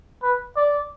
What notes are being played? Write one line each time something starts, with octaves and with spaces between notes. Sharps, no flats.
B4
D5